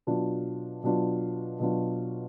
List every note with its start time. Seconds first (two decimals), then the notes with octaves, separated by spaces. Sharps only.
0.07 B2 F#3 D4 F4
0.83 B2 F#3 D4 F4
1.60 B2 F#3 D4 F4